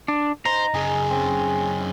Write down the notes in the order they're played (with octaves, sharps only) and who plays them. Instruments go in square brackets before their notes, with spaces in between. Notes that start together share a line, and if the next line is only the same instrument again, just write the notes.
[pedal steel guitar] D4
[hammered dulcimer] D#4 [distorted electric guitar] C5 [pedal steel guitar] A#5
[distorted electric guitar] F#2 C#3 [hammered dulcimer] G#4
[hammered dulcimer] C4 C#4